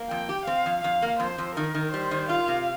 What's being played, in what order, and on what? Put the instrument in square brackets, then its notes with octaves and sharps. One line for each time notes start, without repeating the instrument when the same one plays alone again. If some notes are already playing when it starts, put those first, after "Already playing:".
Already playing: [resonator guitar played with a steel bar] A#3
[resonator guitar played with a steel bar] F2 [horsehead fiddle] G5
[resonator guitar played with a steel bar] G4
[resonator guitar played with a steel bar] C4 [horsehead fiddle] F5
[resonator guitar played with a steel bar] F2
[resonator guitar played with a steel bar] F2 [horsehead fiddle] F5
[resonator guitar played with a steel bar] A#3
[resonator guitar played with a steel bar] F2 [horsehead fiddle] C5
[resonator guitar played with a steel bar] F2
[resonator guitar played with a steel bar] D#3 [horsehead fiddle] A#4
[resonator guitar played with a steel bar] D#3
[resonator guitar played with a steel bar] G3 [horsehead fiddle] C5
[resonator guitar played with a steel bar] D#3
[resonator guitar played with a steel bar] F4 [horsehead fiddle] F5
[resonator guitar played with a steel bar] C3